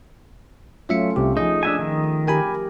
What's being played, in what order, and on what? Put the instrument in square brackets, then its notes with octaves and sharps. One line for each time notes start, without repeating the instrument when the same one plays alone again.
[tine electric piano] F#3 E5 C#7 [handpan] A3 C#4 F4
[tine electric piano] C2 C3 G4
[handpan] F3 G#4 [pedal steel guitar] D#4 [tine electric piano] D#5
[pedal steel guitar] D4 E5 G#5
D#3
[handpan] G4 A#4 [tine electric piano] G5 G#5 B5